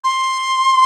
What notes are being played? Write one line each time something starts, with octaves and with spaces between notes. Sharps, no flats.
C6